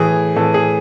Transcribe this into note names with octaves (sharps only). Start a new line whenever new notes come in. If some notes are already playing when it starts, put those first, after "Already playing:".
Already playing: A2 E3 G#4
A2 E3 A4
G#4